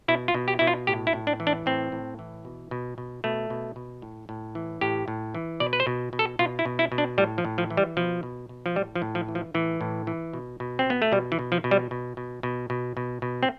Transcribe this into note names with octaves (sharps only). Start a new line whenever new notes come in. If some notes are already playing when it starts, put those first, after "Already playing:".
B2 E4
F4
B2
G4
B2 E4
F4
A2 G4
E4
A2
D4
E3
D4
A2 C4
A2
E3
B2
B2
B2
B2 A3
B2
B2
A2
A2
E3
A2 G4
A2
E3
B2 D5
B4
C5
B2
B2
A4
B2 F4
E4
B2
E4
B2
D4
A2 G3
F3
A2
F3
E3
G3
B2 F3
B2
B2
F3
A2 G3
F3
A2
F3
E3
F3
A2 E3
A2
E3
B2
B2
C4
B2 B3
A3
B2 G3
E3
B2
F3
B2
G3
B2
B2
B2
B2
B2
B2
C4